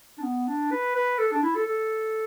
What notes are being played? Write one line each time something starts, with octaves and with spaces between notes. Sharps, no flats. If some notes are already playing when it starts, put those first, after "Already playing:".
D4
B3
D4
B4
B4
A4
D4
E4
A4
A4